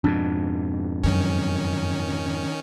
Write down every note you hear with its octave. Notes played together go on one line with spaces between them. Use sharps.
F2 G#2 B2 D4
F#2 D#3 C#4